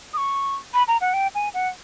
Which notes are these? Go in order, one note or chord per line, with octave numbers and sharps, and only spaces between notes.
D#6
C#6
B5
A#5
F#5
G5
G#5
F#5